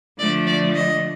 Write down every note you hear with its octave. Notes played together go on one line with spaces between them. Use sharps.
D3 F3 A3 D5
D5
D#5